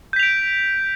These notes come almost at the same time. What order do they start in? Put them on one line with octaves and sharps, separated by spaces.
G6 B6 F7 D7